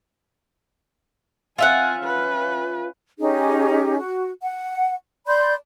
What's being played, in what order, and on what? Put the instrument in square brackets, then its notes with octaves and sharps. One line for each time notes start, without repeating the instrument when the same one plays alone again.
[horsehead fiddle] C4 G#5 [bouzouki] F4 E5 F#5
[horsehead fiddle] C#4 B4
[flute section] C#4 D#4 G4 G#4
F#4
F#5
D5 B5 C6 G6